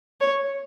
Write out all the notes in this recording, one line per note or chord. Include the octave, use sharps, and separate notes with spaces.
C#5